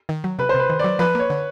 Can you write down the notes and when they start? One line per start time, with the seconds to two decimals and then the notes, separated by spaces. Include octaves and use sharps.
0.09 D#3
0.24 F#3
0.39 C3 B4
0.49 C5
0.54 C3
0.59 B4
0.70 D#3
0.79 F#3 D5
0.99 F3 B4
1.15 A#3 C#5
1.30 D3